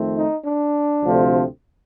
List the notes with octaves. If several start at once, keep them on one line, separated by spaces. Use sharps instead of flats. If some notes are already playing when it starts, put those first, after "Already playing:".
Already playing: F2 D#3 A3 C4
D#4
D4
D2 C3 F3 A3 C4